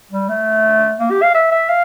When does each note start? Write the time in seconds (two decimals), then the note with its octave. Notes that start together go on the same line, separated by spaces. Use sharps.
0.11 G3
0.29 A3
0.99 A#3
1.11 G4
1.22 F5
1.34 E5
1.51 E5
1.69 F5